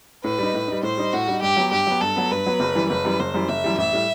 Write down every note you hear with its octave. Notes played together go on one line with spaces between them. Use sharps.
A2 B4
G3 D#4
A2
G3 D#4
A2 C5
G3 D#4
A2 F#4
G3 D#4
G2 G4
F#3 B3
G2 G4
F#3 B3
G2 A4
F#3 B3
G2 B4
F#3 B3
F#1
F#2 E3 G3
F#1 B4
F#2 E3 G3
F#1 C5
F#2 E3 G3
F#1 E5
F#2 E3 G3
A1 E5
A2 G3